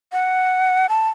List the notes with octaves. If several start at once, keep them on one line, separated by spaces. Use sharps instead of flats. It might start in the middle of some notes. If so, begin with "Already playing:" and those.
F#5
A5